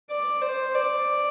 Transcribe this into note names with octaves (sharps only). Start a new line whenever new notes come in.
D5
C5
D5